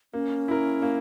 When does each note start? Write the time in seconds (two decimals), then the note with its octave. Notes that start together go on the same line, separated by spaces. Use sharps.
0.13 A#3 C#4
0.48 E4 A#4
0.82 A#3